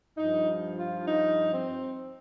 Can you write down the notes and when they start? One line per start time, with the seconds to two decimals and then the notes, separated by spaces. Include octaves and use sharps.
0.17 G2 F3 D#4
0.78 F4
1.07 D#4
1.52 C4